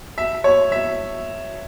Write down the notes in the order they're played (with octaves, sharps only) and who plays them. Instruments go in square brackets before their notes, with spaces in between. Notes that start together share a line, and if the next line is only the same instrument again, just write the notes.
[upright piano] E5
C#5
E5